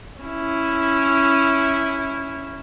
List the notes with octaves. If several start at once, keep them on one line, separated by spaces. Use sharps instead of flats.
C#4 E4